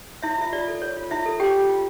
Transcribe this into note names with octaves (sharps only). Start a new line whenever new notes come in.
E4 C#5 E5
F4 E5
F4 D5
A4
C#5
F4
E4 F4 E5
A4
G4 C#5 G5
F4
F4